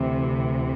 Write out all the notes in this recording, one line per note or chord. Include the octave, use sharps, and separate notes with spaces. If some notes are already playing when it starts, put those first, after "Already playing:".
Already playing: D2 C3 E3